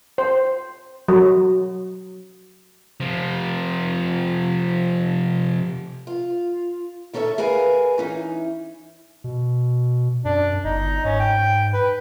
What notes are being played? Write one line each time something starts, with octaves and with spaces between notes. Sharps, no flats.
C5
F#3
C3 F3
F4
D#3 C#4 A4 C#5 E5
G#4 A#4 B4 F5 G#5
E3 C#4 D#4
B2
F#2 D4
G1 D#4
G#2 C#4
G5
B4